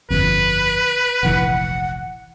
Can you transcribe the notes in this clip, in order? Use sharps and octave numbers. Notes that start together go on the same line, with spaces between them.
G1 F2 B4
F1 A#1 E3 F#5